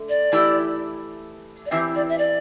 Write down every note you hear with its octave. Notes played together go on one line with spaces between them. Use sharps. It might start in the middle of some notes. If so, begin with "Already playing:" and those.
Already playing: D3 A3
D5
E3 A3 E4 G4
D5
E2 E3 C4 E4 G4 E5
D5
E5
D5